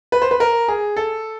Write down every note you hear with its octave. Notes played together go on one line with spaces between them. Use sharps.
B4
C5
B4
A#4
G#4
A4